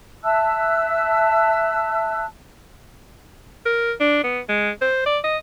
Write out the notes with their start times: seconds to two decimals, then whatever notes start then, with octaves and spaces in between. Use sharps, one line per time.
0.24 E5 A5 E6 F#6
3.66 A#4
4.01 D4
4.24 B3
4.49 G#3
4.81 C5
5.06 D5
5.24 D#5